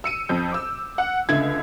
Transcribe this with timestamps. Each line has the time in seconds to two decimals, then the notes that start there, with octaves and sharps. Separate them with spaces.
0.04 E6 C#7 D#7
0.29 F2 G6
0.52 D6 E6
0.98 F#5
1.29 C#2 D3 A3 E5 G#6